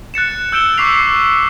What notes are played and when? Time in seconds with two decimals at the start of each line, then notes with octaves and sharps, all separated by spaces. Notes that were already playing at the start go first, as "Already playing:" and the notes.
0.14 F#6 A6 C#7 E7
0.52 E6 G6 D7 E7 G7
0.78 C#6 D6 E6 B6 C7 F7